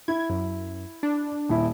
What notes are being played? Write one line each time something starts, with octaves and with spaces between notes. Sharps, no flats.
E4 G#6
F#2
D4
D#1 E4